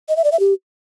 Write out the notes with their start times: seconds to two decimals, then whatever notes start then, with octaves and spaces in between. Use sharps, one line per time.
0.09 D#5
0.16 E5
0.24 D5
0.32 E5
0.39 G4